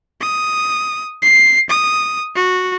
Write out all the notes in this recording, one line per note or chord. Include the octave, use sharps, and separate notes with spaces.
D#6
C7
D#6
F#4